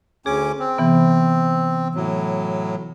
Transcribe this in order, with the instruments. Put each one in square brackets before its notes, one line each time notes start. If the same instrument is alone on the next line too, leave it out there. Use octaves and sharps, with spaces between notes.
[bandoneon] D2 C#4 D6 [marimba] G#4
[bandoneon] C4
[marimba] C3 E3 B3
[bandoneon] A2 F#3